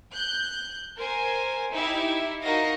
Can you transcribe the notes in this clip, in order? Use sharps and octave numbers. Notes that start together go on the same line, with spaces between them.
F#6 G6
A#4 C5 G#5
D#4 E4 G4 E5
D#4 F#4 A#4 D#5 F5 A#6